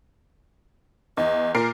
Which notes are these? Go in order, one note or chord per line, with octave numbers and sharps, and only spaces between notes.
E2 D#5
A#2 A#4 C7